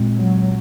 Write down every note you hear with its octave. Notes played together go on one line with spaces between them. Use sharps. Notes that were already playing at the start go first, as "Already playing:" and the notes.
Already playing: A#2 G#3 C4
F#3